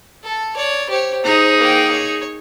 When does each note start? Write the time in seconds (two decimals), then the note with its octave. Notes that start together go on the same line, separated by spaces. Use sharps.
0.24 A4
0.55 C#5 D5
0.90 G4 C5 C#5
1.25 D#4 G#4 A#5
1.58 A#3 G5
1.91 C#5